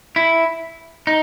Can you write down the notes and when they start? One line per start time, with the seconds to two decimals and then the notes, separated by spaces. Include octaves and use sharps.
0.16 E4
1.07 D#4